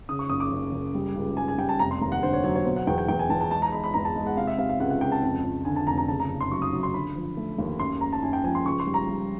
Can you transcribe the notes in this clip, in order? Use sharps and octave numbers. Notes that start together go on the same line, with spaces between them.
C#3 D#6
C#6
F#1 D#6
D6
F#1
F#1
G3
C#2
G3 G#5
G#5
G3 G5
A5
F1 A#5
C6
D#2 A#5
F#5
D3 C5
C#5
F#3 C#5
C#5
B2 C5
F#5
E2 G5
G5
E2 G5
G#5
E2 A5
A5
G#3 A5
A#5
G#3 B5
B5
E2 A#5
A5
G#3
F#5
C3 F5
E5
C3 F5
F5
C#2 F#5
F#5
C#2 G5
A5
F2
F2
D3 G#5
A5
F1 A#5
A#5
C#3 A5
A#5
F#1
C6
F#3 C#6
D#6
F#3
C6
D3 B5
F3
A3
D#2
F#2 C6
F#2 A#5
A5
F#2 G#5
G5
F3 G#5
C6
C#2 C#6
C6
G3
A#5
G3